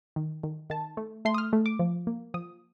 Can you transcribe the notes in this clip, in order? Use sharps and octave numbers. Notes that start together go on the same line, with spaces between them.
D#3
D#3
D#3 A5
A3
A3 C6
D#6
F6
A3
D6
F3
A#3
F3 D#6